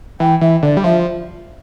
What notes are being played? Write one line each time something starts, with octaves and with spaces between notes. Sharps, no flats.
E3 G5
E3 E5
D3 D5
G3
F3 E5